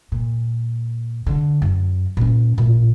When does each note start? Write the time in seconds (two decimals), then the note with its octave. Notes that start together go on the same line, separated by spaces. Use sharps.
0.12 A#2
1.27 D3
1.62 F#2
2.17 A#2 C#4
2.58 A1 A#2